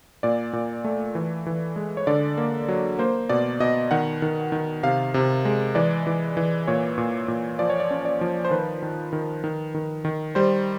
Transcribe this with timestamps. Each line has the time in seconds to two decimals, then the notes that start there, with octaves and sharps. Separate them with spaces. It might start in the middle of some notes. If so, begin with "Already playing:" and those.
0.23 A#2 D5
0.53 A#2
0.84 A3
1.15 E3
1.46 E3
1.76 G#3
1.97 C#5
2.07 D3 D5
2.38 A#3
2.68 F#3
2.99 A#3 C5
3.29 B2 D5
3.60 B2 D#5
3.91 D#3 F#5
4.22 D#3
4.52 D#3
4.83 C3 F5
5.14 C3
5.45 G#3
5.75 E3 D5
6.07 E3
6.37 E3
6.67 A#2 C#5
6.98 A#2
7.28 A#2
7.59 F3 D5
7.70 C#5
7.80 D5
7.91 C#4
8.05 D5
8.21 F3
8.45 C5
8.51 D#3 B4
8.82 D#3
9.13 D#3
9.44 D#3
9.74 D#3
10.05 D#3
10.35 G3 C5